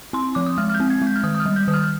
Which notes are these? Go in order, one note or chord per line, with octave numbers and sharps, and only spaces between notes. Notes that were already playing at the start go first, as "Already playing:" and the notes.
C4 C6
F3 D6
D#6
G#3 F6
F6
G6
C4
G#6
G#3
G6
F6
D#3 D#6
D#6
F6
G3
G6
D#3 D#6
F6
F6